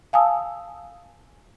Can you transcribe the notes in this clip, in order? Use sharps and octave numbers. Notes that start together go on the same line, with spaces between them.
F5 G#5 A5 D#6 E6